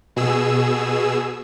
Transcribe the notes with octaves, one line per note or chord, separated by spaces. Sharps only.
B2 G#4 E6